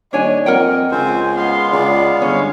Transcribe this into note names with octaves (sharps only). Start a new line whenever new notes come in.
D#1 D4 C#5 D#5 G#5
F2 A#4 D#5 F#5 G5
C#2 C4 C5 G#5
G#3 B3 F5 C6
C#2 D5
G1 C#4 C#5